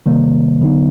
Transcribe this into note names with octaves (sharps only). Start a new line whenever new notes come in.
C3 D#3 G3 A#3
D3 F#3 B3 D#4